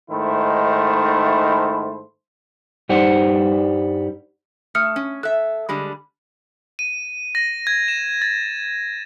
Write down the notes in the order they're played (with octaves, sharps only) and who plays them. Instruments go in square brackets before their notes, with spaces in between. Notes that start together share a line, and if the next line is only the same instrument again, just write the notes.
[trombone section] G#2 D#3 A3 E4 C5
[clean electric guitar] G2 G3 D#4 C5 F#5
[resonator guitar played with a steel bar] A3 [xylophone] D#6 F6 C#7
[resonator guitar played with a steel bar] C#4
[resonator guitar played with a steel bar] A4 E5 [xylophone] F#6
[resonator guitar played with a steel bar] D3 G3 G#3 [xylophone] B5
[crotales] D#7
A#6
G#6
E7
A6